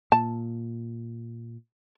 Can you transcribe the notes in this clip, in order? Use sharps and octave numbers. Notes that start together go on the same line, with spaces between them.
A#2 A5